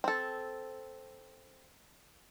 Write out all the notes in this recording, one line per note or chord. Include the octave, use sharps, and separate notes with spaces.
C4 A4